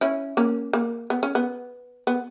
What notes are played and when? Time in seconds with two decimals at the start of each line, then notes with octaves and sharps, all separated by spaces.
0.01 C#4 E4
0.37 A#3 C#4
0.73 A#3
1.10 B3
1.23 C#4
1.35 B3
2.07 B3